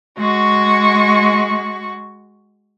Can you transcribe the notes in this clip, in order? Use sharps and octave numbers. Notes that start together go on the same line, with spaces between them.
G#3 F#4 C#6